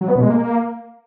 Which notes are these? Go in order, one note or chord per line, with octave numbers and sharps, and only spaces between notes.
F#3
B3
B2
G#3
A#3